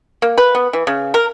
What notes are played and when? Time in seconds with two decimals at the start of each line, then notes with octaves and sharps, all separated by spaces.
0.22 A#3
0.38 B4
0.55 B3
0.73 E3
0.87 C#3
1.14 A#4